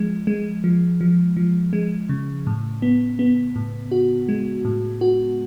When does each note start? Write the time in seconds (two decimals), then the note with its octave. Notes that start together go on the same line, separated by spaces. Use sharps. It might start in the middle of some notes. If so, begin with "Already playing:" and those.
Already playing: F3 G#3
0.27 G#3
0.64 F3
1.01 F3
1.37 F3
1.73 G#3
2.09 C#3
2.47 A2
2.82 B3
3.19 B3
3.56 A2
3.91 F#4
4.29 G#3
4.65 A2
5.01 F#4